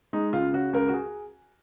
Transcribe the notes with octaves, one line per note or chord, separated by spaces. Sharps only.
G#3 D#4
C#2 F4
C#3 F#4
C#2 A#4
F#4
G#4